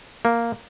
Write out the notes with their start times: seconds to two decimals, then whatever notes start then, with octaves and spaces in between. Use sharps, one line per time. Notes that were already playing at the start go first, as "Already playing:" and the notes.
0.25 A#3